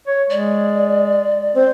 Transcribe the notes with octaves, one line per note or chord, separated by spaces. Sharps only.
C#5
G#3 D5
C4 C5